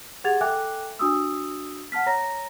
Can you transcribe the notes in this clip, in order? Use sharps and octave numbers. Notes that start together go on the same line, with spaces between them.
G4 G#4 F#5 G#6 A6 F7
A4 E5 G5 G#5 D6 F#6
D4 F#4 D#6 E6
F#5 A5 F6 B6
C#5 A#5 A#6